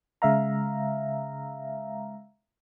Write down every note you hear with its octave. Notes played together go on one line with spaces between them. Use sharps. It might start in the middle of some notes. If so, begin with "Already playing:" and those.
C#3 G#3 E5 F5 A#5